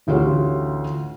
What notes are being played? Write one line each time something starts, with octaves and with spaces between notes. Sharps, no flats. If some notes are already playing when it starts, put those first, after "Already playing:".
A1 D2 F4 G4 C#5